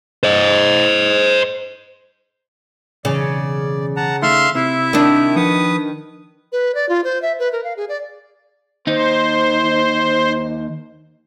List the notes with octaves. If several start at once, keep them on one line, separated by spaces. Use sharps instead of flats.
C5 D#5
B1 E2 C#3 D5
F#5 A5 A#5
D#3 A3 E5 F5 C6
C3 E4 E5
D#3 D4
F3 B4 F#5 D#6
B4
D5
F4
C5
E5
B4
A#4
F5
G#4
D5
D#2 D#4 C5